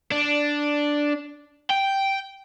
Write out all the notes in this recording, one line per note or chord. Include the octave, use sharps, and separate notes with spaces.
D4
G5